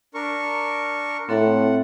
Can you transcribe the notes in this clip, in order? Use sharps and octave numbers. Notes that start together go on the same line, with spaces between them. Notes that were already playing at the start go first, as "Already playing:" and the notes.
D4 A#4 C#6
A2 C4 A4 F#5